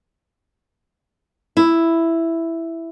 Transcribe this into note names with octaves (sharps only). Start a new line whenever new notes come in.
E4